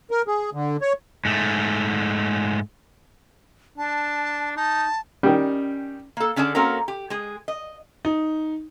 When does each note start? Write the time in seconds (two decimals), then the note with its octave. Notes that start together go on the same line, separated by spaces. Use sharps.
0.11 A#4
0.28 G#4
0.53 D3
0.81 C#5
1.25 G#2 A3
3.78 D4 A5
4.57 D#4 A5
5.23 D#3 G3 C#4
6.17 A#3 A4
6.36 D3 C#4 G#4 D5 A5
6.55 A#3 C4 C#4 F#4 A4 A#4
6.88 G4
7.10 G#3 G#4
7.48 D#5
8.05 D#4